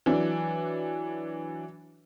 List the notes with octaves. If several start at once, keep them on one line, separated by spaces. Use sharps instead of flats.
E3 F#3 D4